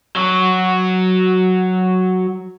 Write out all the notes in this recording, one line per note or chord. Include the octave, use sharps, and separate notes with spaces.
F#3 F#4